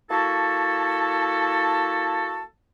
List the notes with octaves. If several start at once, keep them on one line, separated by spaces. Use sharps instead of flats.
A#3 E4 F#4 A4 A5